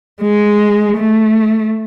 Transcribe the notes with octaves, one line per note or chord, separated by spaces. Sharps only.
G#3
A3